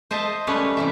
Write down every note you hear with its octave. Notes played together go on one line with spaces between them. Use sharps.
C5 D#5 E5 A5
G3 A3 C#4 B4 C#5
C3 E3 E5